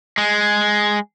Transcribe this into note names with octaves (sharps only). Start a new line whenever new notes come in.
G#3